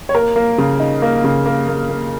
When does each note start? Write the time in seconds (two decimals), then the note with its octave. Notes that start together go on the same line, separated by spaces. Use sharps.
0.09 C#5
0.15 A#3 A#4
0.36 A#3
0.58 C#3
0.80 D#4
1.02 A#3
1.24 C#3
1.46 A#3
1.68 A#3
1.89 A#3